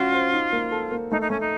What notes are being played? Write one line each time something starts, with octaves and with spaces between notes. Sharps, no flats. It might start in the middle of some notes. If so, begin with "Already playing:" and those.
Already playing: C#4 F4 F#4
C5
D#4
A#3
A4
A#3
A3 D#4
D#4
A3 C#4
D#4